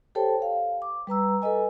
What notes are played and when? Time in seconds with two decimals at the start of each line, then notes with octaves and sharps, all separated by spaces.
0.15 G4 A4 C5 C#5 G5 A5
0.42 F5
0.82 D6
1.07 G3 B4 A#5 E6
1.42 A4 B4 D#5 G#5